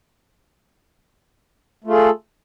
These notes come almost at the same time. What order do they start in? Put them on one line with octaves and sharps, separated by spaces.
A3 F4 G#4 A4